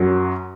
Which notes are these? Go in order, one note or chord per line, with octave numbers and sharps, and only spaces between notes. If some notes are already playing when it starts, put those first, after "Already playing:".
Already playing: F#2 F#3